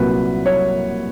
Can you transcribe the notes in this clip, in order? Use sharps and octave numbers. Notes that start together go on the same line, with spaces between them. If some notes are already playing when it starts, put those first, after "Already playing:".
Already playing: C2 A#2 F#3 A#3 B4
C#5